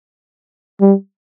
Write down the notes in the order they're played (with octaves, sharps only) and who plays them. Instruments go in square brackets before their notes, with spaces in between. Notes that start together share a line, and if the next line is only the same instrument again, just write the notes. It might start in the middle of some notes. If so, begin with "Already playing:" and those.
[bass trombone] G3